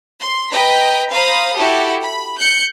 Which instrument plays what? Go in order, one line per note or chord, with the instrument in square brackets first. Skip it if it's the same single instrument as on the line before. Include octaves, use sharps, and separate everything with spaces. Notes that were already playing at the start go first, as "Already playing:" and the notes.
[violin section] C6
B4 D#5 G5 A#5 B6
C5 F5 A#5 B5 D#6
E4 F#4 G4 A4
B5
F#6 G6 C#7